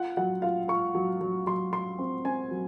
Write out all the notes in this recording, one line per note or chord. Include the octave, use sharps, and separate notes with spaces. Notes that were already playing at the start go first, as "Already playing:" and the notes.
Already playing: F4 F#5
F#3 F#5
F4 F5
F4 C#6
F#3
F#3
F#3 C6
F#3 C6
C4
C4 G#5
F#3